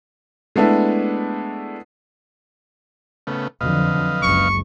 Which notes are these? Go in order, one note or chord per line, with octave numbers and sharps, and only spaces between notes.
G#3 A3 B3 D4 E4
C#3 A3 B3
F2 D3 F#3 B4 D#5 F5
F#1 C#2 C#6